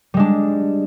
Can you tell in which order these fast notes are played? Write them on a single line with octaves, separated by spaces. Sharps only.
G3 G#3 D4